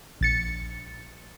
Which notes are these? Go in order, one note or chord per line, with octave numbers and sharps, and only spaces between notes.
A#1 A6 C#7